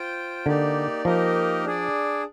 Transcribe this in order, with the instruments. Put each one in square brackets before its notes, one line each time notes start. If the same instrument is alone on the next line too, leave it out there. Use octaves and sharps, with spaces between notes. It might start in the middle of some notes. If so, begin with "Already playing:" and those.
Already playing: [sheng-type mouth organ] F4 C5 G5
[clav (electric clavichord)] D3 [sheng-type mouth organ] A#3 D#4 G4 D5
[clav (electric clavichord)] F3 [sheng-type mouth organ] A#3 D#4 G4 A#4 D#5
[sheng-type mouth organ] D4 G#4 D5